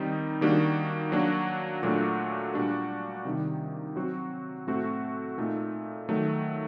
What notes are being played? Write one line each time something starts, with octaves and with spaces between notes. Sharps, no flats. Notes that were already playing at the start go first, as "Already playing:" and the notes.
Already playing: D#3 G3 C4 D#4
D#3 G3 A#3 D4 F#4
F#3 A#3 D4 F#4
A#2 F#3 A3 D4 F#4
A#2 G3 D4 F#4
C3 D#3 G3
F#3 C4 F#4
A2 A3 C4 F#4
A#2 A3 D#4
D#3 F#3 A3